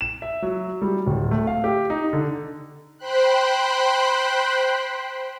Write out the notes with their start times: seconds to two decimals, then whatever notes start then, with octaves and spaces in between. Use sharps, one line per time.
0.01 E7
0.22 E5
0.42 F#3
0.82 G3
1.06 D1
1.31 A3
1.47 F5
1.64 G4
1.90 D#4
2.13 D3
2.99 C5 G5 B5 C6 F#6